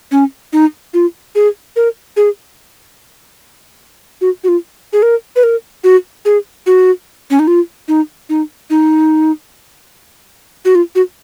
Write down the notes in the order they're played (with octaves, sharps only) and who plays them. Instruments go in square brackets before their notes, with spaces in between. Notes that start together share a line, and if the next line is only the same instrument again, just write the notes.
[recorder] C#4
D#4
F4
G#4
A#4
G#4
F#4
F#4
F4
G#4
A#4
B4
A#4
F#4
G#4
F#4
C#4
D#4
F4
D#4
D#4
D#4
F#4
F4
F#4